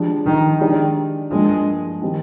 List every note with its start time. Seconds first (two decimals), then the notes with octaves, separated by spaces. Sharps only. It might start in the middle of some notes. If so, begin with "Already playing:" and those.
Already playing: F3 G#3 D4 G4
0.26 D#3
0.60 D#3 G#3 D4 G4 D5
1.31 G2 F3 G#3 A#3
2.02 D#3 G3 C4 G4